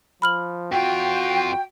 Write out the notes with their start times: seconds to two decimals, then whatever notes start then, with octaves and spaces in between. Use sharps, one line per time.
0.22 F3 B5 F6 F#7
0.72 F2 F4 F#4 G5